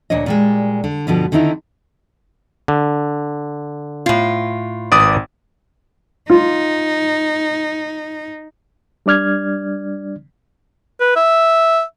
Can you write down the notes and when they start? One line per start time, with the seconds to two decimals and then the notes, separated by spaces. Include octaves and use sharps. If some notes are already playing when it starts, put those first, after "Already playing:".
0.10 D2 A#2 D4 C#5 D#5
0.26 A#2 G3 G#3
0.84 D3
1.07 G2 B2 D3 F3 G3
1.32 D3 D#3 C4 D#4 E4
2.68 D3
4.06 A2 F4
4.92 G#1 B4 D5 D#6
6.30 D#4 F4
9.06 G3 D4 D5 F6 G#6
11.00 B4
11.16 E5